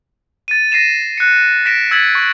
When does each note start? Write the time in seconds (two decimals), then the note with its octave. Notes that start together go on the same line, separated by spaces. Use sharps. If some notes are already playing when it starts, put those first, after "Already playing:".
0.48 A6 D#7
0.72 A#6 C7 D#7 E7
1.18 F#6 C#7
1.66 A#6 B6 D7 E7
1.91 E6 G#6 A6 B6 F#7
2.15 C#6